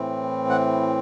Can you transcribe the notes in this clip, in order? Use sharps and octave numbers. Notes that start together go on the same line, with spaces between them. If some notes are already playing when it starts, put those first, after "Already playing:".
Already playing: A2 E3 C4
F#5